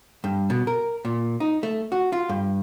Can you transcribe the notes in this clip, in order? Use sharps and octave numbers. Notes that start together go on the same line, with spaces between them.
G2
B2
A#4
A#2
D#4
A3
F#4
F4
G2